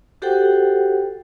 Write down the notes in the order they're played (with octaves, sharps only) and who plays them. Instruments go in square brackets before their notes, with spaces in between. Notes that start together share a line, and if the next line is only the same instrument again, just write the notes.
[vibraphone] F#4 G4 A4 C5 F#5 G5